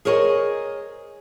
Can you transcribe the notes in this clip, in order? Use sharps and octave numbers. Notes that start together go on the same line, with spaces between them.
G#4 A#4 C5 C#5 D#5 G#5